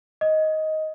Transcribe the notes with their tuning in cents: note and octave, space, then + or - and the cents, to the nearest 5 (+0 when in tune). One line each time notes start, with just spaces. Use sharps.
D#5 +10